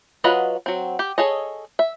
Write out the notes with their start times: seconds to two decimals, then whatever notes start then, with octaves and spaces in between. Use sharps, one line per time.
0.24 F#3 F4 B4 D#5 F#5
0.66 F#3 C4
0.99 G4
1.18 G#4 A4 C#5 D#5
1.79 E5